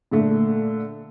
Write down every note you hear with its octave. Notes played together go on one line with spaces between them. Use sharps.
A#2 D3 A3